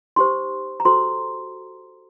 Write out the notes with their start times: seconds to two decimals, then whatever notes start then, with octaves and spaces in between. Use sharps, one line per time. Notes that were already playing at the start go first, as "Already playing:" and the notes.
0.16 D#4 G4 C5 C6
0.80 A#5
0.85 F#4 A4 C5 C6